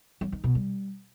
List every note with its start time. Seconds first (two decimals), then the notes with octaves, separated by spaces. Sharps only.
0.21 F#3
0.32 D#3
0.44 B2
0.55 G3